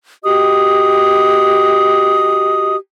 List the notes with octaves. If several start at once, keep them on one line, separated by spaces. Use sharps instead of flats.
F#4 G4 D#5 D#6